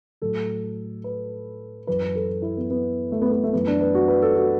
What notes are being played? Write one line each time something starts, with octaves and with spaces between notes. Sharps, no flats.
A2 F#3 A4
B4
F#2 E3 B4
B4
A4
E4
B3
B3
A3
B3
B3
A3
F#2 E3 B3
D4
B4
F#4
B4
A4
F#4